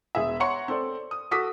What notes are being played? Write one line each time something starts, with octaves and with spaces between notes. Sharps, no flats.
E1 G#4 E5
C#5 F#5 A#5 C6 C#6 C#7
C4 A4 D5
D#6
F#4 A4 D6 D#6 B6